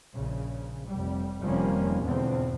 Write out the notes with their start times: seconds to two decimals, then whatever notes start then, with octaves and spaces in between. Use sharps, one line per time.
0.14 A#1 C#3
0.87 F1 G3
1.43 F1 D#3 F3 G3 A#3 C#4
2.03 E2 G#2 B2 D3 F3 C4